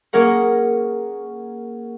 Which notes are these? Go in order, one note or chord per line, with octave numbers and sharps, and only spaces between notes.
A#3 C#4 G#4 A#4 F#5